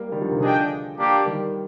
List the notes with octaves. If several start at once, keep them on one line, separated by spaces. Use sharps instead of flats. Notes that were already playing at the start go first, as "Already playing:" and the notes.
Already playing: G3 A#3
D#3 G3
D3 F3
C3 D#3
D3 F3 D4 G#4 D#5 G5
A#3 D4 G4
D#3 G3